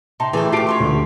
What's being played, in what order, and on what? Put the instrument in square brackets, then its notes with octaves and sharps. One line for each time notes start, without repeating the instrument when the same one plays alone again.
[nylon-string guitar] C3 [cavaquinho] D#4 A5 C6
[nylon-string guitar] E3 [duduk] A3 [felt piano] G#4 [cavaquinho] D5 G5
[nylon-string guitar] F4 G4 [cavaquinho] A5 D6 [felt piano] C7 D7
[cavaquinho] C#5 D5 C6
[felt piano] D2